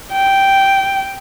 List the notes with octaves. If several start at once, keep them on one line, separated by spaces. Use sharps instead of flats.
G5